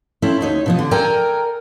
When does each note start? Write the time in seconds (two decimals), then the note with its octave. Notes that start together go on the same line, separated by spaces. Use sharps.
0.22 C4 C#4 E4 A4
0.41 D2 D#4 C#5
0.66 B2 F3 B3
0.79 D3
0.91 A4 A#4 D5 G5 G#5 A#5